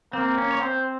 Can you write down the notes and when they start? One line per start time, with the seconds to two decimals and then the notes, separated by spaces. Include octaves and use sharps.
0.13 A#3 C4
0.38 C#4
0.51 C#5
0.61 C4 C5